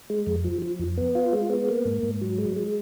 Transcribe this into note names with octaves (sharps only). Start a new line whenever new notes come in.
G#3
F2
F3
F3
F2
B3
F4
G#3
B3
A#3
G#2
G#2
F#3
G#3
G#3